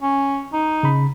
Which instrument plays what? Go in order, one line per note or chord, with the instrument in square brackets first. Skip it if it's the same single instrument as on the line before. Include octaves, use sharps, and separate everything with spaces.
[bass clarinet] C#4
D#4
[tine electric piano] C#3 B5